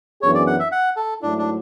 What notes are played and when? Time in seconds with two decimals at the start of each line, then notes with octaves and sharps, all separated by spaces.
0.22 F#2 E3 B3 D4 G#4 C#5
0.35 D5
0.47 F#5
0.60 E5
0.72 F#5
0.96 A4
1.22 G#2 F#3 A3 D4 E4
1.38 D4